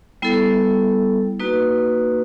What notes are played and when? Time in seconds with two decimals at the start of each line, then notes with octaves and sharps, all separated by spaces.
0.22 G3 B3 E4 A4
1.40 A#3 D#4 F#4 B4